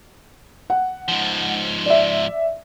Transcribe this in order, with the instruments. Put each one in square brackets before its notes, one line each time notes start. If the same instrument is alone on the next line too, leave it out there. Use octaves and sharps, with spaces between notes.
[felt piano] F#5
[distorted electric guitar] G#2 F3
[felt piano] D5 E5